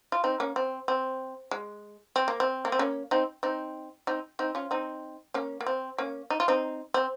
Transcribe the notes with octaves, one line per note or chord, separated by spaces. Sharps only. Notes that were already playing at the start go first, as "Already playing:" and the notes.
F4
C4 D#4
A#3 C#4
C4
C4
G#3
C4
A#3
C4
A#3
C4
A#3 C#4
C4 D#4
C4 D#4
C4 D#4
C4 D#4
C#4 F4
C4 D#4
A#3 C#4
A#3
C4
A#3 C#4
D#4
F4
C4 D#4
C4